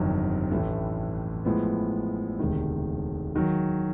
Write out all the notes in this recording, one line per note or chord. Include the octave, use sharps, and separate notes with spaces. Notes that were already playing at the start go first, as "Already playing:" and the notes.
Already playing: G1 F2 C3 D#3 F#3
A1 A2 E3 A3
A2 F3 G#3 B3
E1 D2 C3 D#3
D#3 F#3